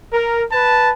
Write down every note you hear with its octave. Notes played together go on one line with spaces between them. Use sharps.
A#4
B4 A5